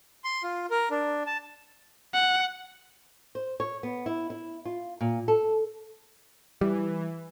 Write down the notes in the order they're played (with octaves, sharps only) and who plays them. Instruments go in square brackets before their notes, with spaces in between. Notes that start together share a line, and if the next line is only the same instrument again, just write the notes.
[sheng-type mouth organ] C6
F4
A#4
D4
A5
[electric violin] F#5
[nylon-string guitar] C5
C#5
B3
E4
E4
F4
A#2
A4
[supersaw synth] E3 [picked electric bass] G3